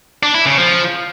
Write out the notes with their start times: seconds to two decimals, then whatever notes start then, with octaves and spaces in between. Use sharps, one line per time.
0.23 D4
0.35 E4
0.46 C#3
0.58 F3